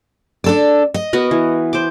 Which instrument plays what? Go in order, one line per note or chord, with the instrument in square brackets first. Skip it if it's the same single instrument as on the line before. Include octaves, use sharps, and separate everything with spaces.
[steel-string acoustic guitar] D4 A4 D5
D#5
[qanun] B3 F#4 A#4
E3
C5 D6